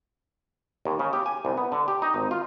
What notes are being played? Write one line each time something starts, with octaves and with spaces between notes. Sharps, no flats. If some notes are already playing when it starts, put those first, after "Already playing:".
D#2
C#3
G4
G#5
C2
B3
D3
G4
D#4
G#1
F4